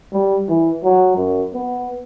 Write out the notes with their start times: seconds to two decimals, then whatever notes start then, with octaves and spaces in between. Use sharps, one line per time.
0.13 G3
0.49 E3
0.84 F#3
1.16 F#2
1.54 B3